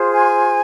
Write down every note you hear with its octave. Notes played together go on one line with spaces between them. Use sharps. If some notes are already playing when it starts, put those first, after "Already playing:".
Already playing: F4 G#4 C5
G#5